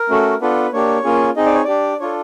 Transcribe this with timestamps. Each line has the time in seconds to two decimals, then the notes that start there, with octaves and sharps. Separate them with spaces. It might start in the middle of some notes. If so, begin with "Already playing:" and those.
Already playing: A#4
0.10 A3 C#4 F#4 A4
0.41 B3 D4 F4 A4 B4
0.73 A#3 D4 G4 C#5
1.04 A#3 C#4 F4 G#4
1.36 C4 D#4 G#4 D#5
1.46 D5
1.54 C#5
1.64 D4 G4 D5
2.00 D4 F4 A4 C#5